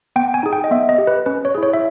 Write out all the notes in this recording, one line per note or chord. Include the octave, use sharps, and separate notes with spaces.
B3 G5
G#5
D#4 G#4
G5
D#5
B3 E5
D#5
G4
B4
C#4 B4
C#5
E4 G#4
C#5
E5